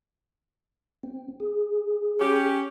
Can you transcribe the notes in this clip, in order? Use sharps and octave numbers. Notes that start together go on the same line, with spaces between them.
C4
G#4
C#4 G4